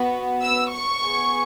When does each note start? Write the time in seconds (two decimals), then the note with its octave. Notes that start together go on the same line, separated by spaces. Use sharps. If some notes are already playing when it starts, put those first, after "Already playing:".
Already playing: B3 F#4
0.42 E6
0.72 C#6
1.03 B3 G#4